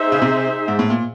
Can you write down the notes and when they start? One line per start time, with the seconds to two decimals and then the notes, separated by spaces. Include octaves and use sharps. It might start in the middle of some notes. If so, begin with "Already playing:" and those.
Already playing: D#4 G#4 C5 E5
0.12 C#3
0.22 C3
0.68 G#2
0.79 A2
0.90 A#2